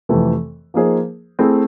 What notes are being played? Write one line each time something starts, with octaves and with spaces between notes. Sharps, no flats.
F2 C3 E3 A3
F3 A#3 D#4 G#4 C5
A3 C4 E4 G#4